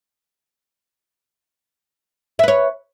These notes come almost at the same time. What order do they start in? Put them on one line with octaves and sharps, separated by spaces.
E5 B4 C#5